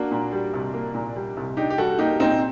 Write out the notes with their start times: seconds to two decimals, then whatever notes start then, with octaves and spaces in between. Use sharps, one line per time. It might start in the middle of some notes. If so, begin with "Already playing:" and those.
Already playing: A#3 D4 F#4
0.11 A#2
0.32 G3
0.53 C2
0.74 A#3
0.95 A#2
1.16 G3
1.37 C2
1.57 D4 D#4 G4
1.70 G4
1.78 G3 F#4 A4
1.99 A#3 D#4 G4
2.20 A#2 C4 D#4